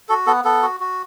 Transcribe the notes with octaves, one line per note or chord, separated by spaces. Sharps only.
F#4 A4
B3 A4
B3 A4
F#4
F#4